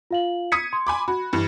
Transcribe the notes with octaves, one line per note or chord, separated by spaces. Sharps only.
F4 F5 F#7
D#6 G#6 B6 C#7
C6
G#5 B5 D6
F#4 B5
G2 E3